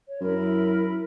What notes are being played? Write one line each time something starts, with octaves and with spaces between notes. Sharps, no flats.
C#5
F#2 E4 A#4 B5